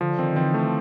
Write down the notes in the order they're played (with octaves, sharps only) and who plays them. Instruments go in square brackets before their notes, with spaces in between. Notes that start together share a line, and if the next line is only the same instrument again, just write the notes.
[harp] D3 [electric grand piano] F3
[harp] D#3 [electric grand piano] C4
[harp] E3 [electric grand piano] C4
[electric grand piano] A3